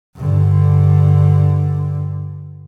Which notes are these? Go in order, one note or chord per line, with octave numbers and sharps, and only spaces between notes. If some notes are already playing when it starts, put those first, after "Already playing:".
G2 D3